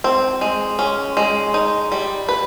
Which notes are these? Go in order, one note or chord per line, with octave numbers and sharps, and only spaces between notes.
C4
G#3
C#4
G#3
D#4
G3
B4